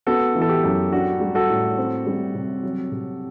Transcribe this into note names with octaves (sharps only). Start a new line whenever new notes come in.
B3 F#4 A4
E3
A4
G4
F#2
D4 F#4
G3
F#4 A4
A2
C4
G3
C3
F#3
C3